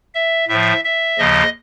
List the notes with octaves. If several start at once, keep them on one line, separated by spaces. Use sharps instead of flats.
E5
A2 F3 E5
E5
D#2 C#3 F3 D#5